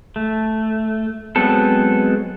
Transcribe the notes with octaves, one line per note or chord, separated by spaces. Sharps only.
A3
F#3 G#3 B3 C4 A4